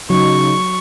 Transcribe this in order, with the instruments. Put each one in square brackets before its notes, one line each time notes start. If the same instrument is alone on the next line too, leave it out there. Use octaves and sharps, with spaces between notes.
[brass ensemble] C#3 D#4 [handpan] F#3 [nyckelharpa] C#6